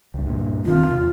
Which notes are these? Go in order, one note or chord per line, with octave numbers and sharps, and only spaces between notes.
C#2 G2
G2 A#2
E1 D#3 C4 F4
E2 C3